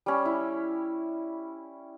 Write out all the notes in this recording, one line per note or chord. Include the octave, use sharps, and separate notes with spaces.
G3 C#4
E4